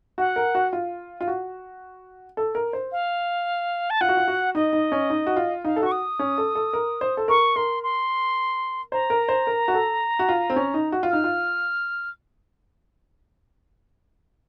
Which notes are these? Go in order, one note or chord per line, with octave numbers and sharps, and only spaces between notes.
F#4 F#5
A#4
F#4
F4
F4
F#4
A4
A#4
C5
F5
A5
F4 F#5
F#4
F4
F#4
D#4 D#5
D#4
C#4
D#4
F#4
F4
D#4 F5
A4
F#4 C#6
D#6
C#4
A4
A4
A#4
C5
A4
A#4 C#6
A#4 C6
C6
C5 A#5
A#4
C5
A#4
F#4
A4
F#4
F4
C4
C#4
D#4
F#4
F4
D#4 F6
F4